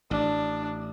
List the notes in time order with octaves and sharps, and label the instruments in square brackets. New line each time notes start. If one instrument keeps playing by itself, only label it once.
[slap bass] A1 [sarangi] D4